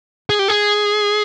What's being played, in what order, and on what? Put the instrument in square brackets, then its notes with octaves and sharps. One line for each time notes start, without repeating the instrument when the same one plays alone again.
[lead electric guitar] G#4
G4
G#4